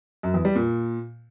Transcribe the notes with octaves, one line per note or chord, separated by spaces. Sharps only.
F#2
E2
G3
A#2